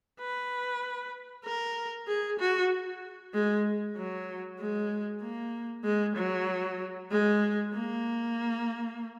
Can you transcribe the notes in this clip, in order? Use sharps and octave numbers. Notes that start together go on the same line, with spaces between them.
B4
A#4
G#4
F#4
G#3
F#3
G#3
A#3
G#3
F#3
G#3
A#3